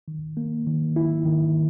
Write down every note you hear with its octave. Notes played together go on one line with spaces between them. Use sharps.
D#3
A#3
D#3
E4
D#3